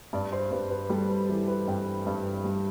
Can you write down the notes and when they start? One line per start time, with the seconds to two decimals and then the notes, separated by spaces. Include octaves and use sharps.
0.13 G2 D5
0.32 C5
0.51 G2 B4
0.70 B4
0.90 G3 A4
1.09 B4
1.29 E3 A4
1.48 B4
1.67 G2 G5
2.06 G2
2.44 G3